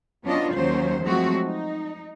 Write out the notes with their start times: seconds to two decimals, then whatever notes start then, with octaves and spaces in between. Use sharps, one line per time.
0.24 F#3 B3 C#4 D4 F4 D#5
0.54 D#2 F#3 A#3 C#4 C5
1.03 F3 F#3 G#3 A3 C4 F#4
1.44 D#4